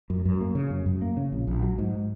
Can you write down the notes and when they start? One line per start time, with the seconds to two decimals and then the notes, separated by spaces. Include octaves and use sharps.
0.10 F#2
0.25 F#2
0.41 A#3
0.55 C#3
0.70 F#2
0.86 F#2
1.02 A#3
1.17 C#3
1.32 A#1
1.47 A#1
1.62 F#3
1.79 G#2